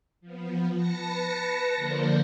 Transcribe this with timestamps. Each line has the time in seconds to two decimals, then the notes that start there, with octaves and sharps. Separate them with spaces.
0.21 F3 B3
0.72 B4 A5 A#6 C#7
1.76 D3 F3 A#3 D4 A#4 C5